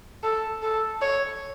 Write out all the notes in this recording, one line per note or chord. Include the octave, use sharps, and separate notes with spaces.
A4
A4
C#5